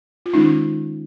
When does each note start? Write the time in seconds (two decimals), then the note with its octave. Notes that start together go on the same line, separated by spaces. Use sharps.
0.26 F4
0.33 D#3 G#3 C#4 D#4